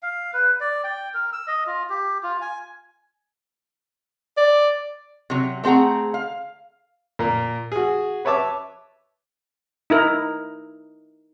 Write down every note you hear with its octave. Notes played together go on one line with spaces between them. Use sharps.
F5
B4
D5
G5
A#4
E6
D#5
F4
G4
F4
G#5
D5
C3 F#3
A3 C4 G#4 F#5 A#5
F5
A#2 A#4
F#4 G#4
B4 C#5 E5 A5 D6
D#4 E4 A#4